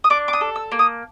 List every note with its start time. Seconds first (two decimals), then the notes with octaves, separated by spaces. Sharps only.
0.04 D#6
0.10 D4 D6
0.28 D6
0.33 D#6
0.41 A4
0.56 E6
0.72 A#3
0.79 D#6